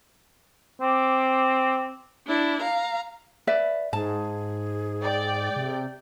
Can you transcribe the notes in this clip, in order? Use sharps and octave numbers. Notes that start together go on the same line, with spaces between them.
C4 D6
D4 E4
F5 A#5
B4 D5 E5
G#2 G#4 A5
D5 G5
C3